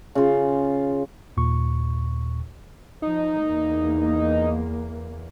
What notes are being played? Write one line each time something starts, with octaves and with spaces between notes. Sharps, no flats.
C#3 F4
D#2 A#2 C#6
F3 D#4
E2 A#3